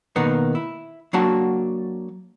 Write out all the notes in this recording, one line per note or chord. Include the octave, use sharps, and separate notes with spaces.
B2 D#3 A#3 B3
E4
F#3 A#3 D4 F#4 A5